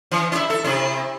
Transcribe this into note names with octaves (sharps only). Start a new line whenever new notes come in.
E3
E4 E5
A4
C3 E4